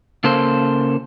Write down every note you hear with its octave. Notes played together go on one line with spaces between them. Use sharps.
C#3 A#3 A4 C5